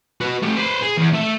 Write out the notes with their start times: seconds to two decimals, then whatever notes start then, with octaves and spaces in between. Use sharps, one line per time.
0.21 F#4 B4
0.43 A3 G4
0.57 B4 C5
0.82 G#4
0.97 E2
1.13 A3 E5